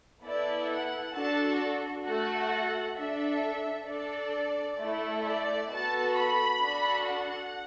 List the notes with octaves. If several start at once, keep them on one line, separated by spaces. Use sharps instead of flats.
B3 E4 A4 D5
F#5
D4 F#4 A4 A5
A3 F#4 A4 F#5
D4 A4 E5
D4 A4 D5
A3 E4 A4
D5
B3 F#4 A4 A5
B5
D4 F#4 A4
F#5